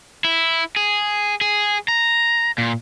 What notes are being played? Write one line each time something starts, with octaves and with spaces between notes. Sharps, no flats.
E4
G#4
G#4
A#5
A#2